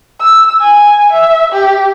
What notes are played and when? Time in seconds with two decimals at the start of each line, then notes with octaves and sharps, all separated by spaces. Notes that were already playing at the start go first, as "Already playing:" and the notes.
0.20 E6
0.62 G#5
1.12 E5
1.52 G4